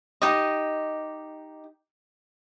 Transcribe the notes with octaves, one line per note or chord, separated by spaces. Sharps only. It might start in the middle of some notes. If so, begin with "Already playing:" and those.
D#4 G4 D#5